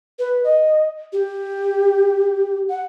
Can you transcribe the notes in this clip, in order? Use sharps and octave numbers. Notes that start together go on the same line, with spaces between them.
B4
D#5
G4
F#5